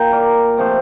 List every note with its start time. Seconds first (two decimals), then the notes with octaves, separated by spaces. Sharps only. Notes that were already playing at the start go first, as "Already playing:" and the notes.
Already playing: A#2 G5 A#5
0.12 A#4 D5
0.58 C3 F3 A3